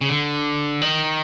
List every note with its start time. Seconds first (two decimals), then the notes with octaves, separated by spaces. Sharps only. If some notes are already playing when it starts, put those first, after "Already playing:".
0.01 C#3
0.09 D3
0.81 D#3